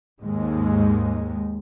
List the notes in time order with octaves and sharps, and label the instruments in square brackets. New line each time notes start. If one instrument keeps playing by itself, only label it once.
[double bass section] D#2 G#2 G#3